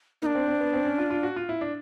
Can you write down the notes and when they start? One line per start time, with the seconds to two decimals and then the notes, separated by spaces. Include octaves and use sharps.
0.22 A#3 D4 D#4
0.35 C4
0.48 C4
0.61 B3
0.73 C4
0.85 C#4
0.98 F4
1.10 F4
1.23 F#4
1.36 F4
1.49 E4
1.61 D4